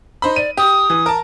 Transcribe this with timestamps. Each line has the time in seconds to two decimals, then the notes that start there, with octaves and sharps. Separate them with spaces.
0.22 D#4 C5 B5
0.36 D5 D#7
0.57 G4 D#6
0.90 E3
1.06 A#4 A5